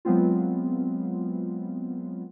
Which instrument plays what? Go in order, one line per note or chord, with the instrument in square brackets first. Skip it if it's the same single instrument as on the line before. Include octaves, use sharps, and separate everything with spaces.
[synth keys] F#3 G#3 B3 C4 F4